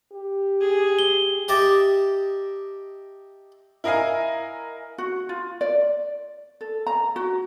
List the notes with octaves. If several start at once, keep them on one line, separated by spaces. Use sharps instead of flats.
G4
G#4
G7
G4 D#5 E5 A5 A#5 D6
E4 A#4 D#5 F5 G#5
F#4
F4
D5
A4
A#5
F#4